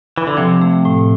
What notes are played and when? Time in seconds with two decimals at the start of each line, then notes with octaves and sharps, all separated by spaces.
0.18 E3
0.27 D3
0.37 C3 F3
0.61 A3
0.85 A2